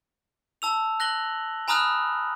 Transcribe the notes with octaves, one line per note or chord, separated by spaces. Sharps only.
A5 E6 F7
F#6 A#6 F#7 G7
G#5 A#5 B5 D#6 F6 F#6